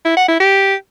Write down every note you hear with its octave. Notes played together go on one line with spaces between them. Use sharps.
E4
F#5
E4
G4